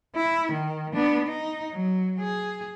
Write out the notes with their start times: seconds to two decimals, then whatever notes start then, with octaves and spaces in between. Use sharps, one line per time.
0.16 E4
0.52 D#3
0.93 B3 D4
1.25 D#4
1.72 F#3
2.20 G#4